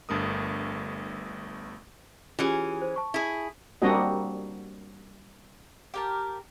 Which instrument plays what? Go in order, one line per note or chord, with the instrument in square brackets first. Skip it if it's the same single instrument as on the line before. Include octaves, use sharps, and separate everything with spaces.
[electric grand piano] G1 G2 A3 A#4 D#6
[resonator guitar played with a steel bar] E3 C#4 G#4 [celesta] F4 G4
[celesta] C5
A5 C#6
[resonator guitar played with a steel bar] E4 G#4
[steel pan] G3 A#3 C4 D4 F#4 D#5
[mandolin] G4 A#4 A5